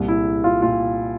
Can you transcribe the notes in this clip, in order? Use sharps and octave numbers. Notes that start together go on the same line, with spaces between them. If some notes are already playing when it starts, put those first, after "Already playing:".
Already playing: C2 A#2
E4
F4
A#2 F4